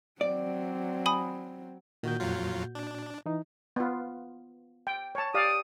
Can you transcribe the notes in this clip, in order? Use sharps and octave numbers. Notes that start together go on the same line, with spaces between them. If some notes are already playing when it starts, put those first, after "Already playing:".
F#3 C4 D5
G#5 B5 D#6
A#2 D#3 F#4 G6
F2 F#3 F4
D4
E3 D#4
B3 F4
G5
C#5 A5
G4 D5 F5 D#6